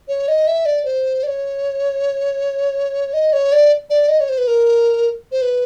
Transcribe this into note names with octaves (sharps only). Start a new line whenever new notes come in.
C#5
D#5
E5
D5
C5
D5
C#5
D#5
C#5
D5
D5
D#5
C#5
C5
B4
A#4
C5
B4